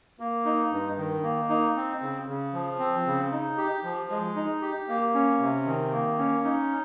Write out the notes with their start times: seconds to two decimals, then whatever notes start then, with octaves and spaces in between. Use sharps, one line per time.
0.19 A#3
0.45 D#4
0.72 G2
0.98 D#3
1.23 A#3
1.49 D#4
1.76 C4
2.02 C#3
2.28 C#3
2.54 F3
2.79 C4
3.06 C#3
3.31 D#4
3.57 G4
3.84 F3
4.10 G#3
4.36 D#4
4.62 G4
4.88 A#3
5.14 C#4
5.40 C3
5.66 D#3
5.92 A#3
6.18 C#4
6.44 D#4